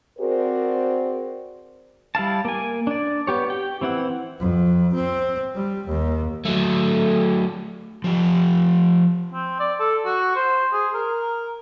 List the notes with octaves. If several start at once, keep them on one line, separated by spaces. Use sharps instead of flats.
C4 F#4 G#4 A#4 C5 D5
G3 E4 F5 A5
A#3 G#5
D4 D5
B3 G4 C#5
G4 G5
E3 C4 E4 F#5
F2
C4
G3
D#2
F#3 A3
F3 G4
C4
D5
A4
F#4
C5
G#4
A#4